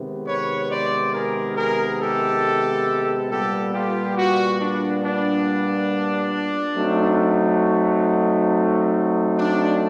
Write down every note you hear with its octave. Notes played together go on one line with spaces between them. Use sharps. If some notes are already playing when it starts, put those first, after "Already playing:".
Already playing: C3 D#3 G#3 B3
B4 C#5
C5 D5
G#4 A#4
G#4 A#4
G4 A4
A#2 G3 B3 G4 A4
F4 G4
F#4
D4
D4
F#3 A3 C4 D#4
D4